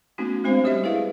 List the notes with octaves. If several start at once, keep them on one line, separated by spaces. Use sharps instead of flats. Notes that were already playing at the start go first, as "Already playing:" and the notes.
A3 B3 C#4 D#4 F#4
G#3 C4 D4 C5 F5
G3 G4 C#5 D#5 E5
E4 G#4 B4 F5